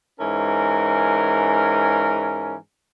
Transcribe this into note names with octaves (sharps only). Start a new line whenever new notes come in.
G#2 E3 C#4 A#4 G#5